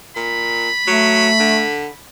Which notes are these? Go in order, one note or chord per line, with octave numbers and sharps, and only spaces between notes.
A#2 B5
F#3 A3
D3